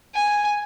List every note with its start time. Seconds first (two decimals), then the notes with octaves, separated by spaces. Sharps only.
0.15 G#5